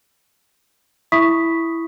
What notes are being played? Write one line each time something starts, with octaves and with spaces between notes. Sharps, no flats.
E4 E5 B5 C#6 D#6 B6